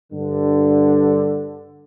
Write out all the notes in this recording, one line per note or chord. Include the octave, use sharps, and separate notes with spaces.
G2 D3